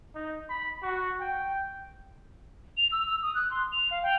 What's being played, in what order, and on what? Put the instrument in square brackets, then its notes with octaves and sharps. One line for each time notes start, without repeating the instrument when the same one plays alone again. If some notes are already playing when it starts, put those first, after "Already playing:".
[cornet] D#4
B5
F#4
G5
[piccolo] F7
E6
E6
D#6
F#6
C6
F7
F5
G5